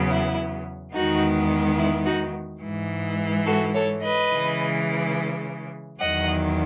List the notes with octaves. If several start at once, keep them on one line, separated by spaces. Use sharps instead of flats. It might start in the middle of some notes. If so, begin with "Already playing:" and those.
Already playing: E2 C#3 F#3 B3
E4
E2 D#3 G#3 B3 D#4 F#4
E4
D#4 F#4
G#2 E3 G#3
F#4 A4
A4 C#5
B4 D#5
C#3 E3 G#3
E2 D#3 F#3 D#5 F#5